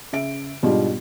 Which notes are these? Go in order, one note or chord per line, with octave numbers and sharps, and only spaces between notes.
C#3 E5 D7
G#2 B2 G3 D4 F4